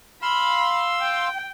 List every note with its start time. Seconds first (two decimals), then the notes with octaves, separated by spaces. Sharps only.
0.22 F5 B5 C6 E6
1.01 G5